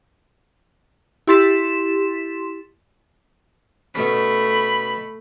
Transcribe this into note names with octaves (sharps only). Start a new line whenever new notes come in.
E4 G4 C6 A6 B6 E7
B2 A3 C#4 B5